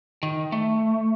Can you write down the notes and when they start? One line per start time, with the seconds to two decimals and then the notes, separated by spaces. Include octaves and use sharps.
0.23 D#3
0.52 A3